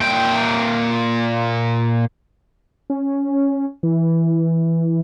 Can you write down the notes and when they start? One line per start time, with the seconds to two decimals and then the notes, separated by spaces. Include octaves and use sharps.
0.01 A#2 G5
2.90 C#4
3.83 E3